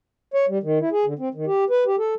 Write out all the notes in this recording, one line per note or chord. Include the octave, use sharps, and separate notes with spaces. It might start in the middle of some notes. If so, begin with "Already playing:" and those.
C#5
G3
D#3
E4
G#4
D3
C4
D#3
G4
B4
G4
A4